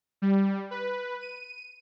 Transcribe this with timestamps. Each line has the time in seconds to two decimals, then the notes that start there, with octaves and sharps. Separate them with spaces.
0.22 G3
0.71 B4
1.21 D#7